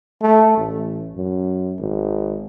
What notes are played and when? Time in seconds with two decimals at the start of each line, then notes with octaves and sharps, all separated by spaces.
0.22 A3
0.57 A1
1.16 F#2
1.79 G#1